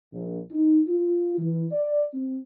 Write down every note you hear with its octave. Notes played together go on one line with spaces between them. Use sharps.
A#1
D#4
F4
E3
D5
C4